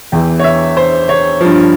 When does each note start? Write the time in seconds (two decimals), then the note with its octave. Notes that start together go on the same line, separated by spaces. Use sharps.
0.12 E2 E3 G5
0.40 C#5
0.44 E5
0.77 C5
1.09 C#5
1.41 G2 F3